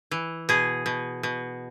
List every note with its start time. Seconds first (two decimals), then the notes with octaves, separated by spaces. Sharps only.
0.11 E3
0.49 B2 G#4
0.86 B2
1.23 B2